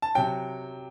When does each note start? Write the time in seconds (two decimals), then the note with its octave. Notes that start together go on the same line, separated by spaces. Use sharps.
0.02 A5
0.15 C3 F#3 G5